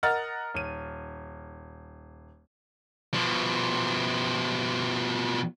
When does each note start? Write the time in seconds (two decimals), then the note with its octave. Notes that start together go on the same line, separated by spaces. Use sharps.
0.03 A#4 D#5 F#5 A#5 F6 A6
0.54 D#1 D#7
3.14 B2 F3